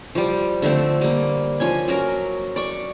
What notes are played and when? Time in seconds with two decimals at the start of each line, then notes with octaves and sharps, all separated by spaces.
0.15 F3 G3
0.62 D3 F3 A3 C4
1.01 G3 A#3
1.60 F3 C#4 G#5
1.88 F#3 C#4 A#4
2.56 D5 C#6